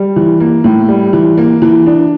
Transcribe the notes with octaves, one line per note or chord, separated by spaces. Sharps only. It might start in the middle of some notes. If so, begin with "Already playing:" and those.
Already playing: G3
E3
A#3
A2
G3
E3
A#3
E3
D4